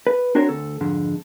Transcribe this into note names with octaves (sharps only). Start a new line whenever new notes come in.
B4
C4 D4 F#4 A#4 C5 C#5
D2 A4
F2 G#2 D3